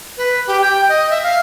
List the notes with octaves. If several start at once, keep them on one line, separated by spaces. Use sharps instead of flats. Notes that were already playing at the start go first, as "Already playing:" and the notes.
B4
G4
G5
D#5
E5
F5